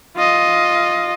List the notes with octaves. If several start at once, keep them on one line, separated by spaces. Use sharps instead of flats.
F4 D#5